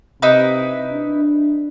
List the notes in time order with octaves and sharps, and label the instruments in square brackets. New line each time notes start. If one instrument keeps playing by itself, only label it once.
[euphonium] C3 [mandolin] D#4 E4 B4
[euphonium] D4